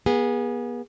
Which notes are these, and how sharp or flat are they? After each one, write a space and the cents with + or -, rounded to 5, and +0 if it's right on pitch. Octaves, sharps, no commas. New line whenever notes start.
B3 -40 G#4 -20